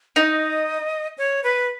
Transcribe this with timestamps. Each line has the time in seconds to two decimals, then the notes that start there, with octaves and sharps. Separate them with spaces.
0.16 D#4 D#5
1.18 C#5
1.44 B4